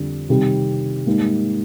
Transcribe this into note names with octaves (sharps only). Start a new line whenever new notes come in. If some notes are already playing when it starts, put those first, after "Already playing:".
Already playing: F2 D3 G3 D4
C3 D#3 G3 C4 G4
G#2 G3 A#3 D#4